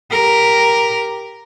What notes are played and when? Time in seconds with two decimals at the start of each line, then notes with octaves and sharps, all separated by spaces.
0.11 G4 A#4